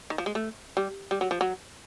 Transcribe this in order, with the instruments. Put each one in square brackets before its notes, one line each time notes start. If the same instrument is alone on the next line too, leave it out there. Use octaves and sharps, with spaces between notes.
[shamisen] D#3
F3
G#3
A3
G3
G3
F#3
F3
F#3